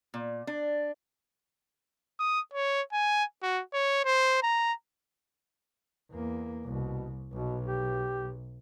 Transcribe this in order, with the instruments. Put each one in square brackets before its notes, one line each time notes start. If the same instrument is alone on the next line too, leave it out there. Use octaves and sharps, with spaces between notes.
[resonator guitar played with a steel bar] A#2
D4
[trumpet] D#6
C#5
G#5
F#4
C#5
C5
A#5
[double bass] E2 A#3
[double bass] C2 [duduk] B2
[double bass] B1 [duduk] B2
[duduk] G4